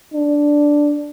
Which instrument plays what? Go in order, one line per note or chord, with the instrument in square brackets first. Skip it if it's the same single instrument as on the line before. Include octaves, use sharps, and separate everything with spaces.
[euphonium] D4